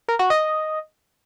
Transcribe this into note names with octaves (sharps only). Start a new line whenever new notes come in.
A#4
F#4
D#5